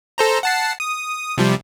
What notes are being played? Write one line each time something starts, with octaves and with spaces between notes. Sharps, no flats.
A4 C5 A#5
F#5 A5 C7
D#6
C3 F3 G3